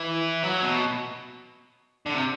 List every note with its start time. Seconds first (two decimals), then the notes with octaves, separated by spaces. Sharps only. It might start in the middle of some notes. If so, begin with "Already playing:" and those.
Already playing: E3
0.43 F#3
0.63 B2
2.06 D3
2.14 C3